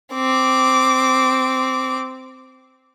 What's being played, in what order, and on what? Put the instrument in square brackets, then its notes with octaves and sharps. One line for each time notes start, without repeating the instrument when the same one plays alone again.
[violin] C4 D6